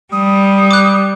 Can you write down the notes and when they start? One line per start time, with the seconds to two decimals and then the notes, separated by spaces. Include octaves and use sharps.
0.12 G3 D#6
0.71 D6 F#6